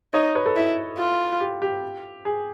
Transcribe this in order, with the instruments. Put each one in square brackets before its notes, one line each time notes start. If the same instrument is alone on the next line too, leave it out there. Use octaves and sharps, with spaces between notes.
[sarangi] D#4 [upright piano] C#5 D#5
[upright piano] B4 C#5
A4 B4
[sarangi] E4
F4
[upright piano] G4
G4
G#4